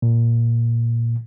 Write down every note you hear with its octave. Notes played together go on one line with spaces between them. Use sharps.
A#2